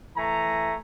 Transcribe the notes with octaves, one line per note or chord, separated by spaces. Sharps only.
E3 A3 G#5 A#5